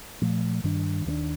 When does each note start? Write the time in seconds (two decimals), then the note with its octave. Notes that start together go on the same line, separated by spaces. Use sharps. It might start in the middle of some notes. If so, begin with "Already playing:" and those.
0.22 A#2 F3 A3
0.64 G2 D#3 G3 D4
1.06 D#2 D#3 A#3 D4